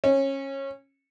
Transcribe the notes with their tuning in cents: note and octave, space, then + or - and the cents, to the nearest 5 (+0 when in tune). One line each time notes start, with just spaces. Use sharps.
C#4 -20